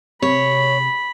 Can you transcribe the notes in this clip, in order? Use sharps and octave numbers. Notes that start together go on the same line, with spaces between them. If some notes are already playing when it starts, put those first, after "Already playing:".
C3 C#5 B5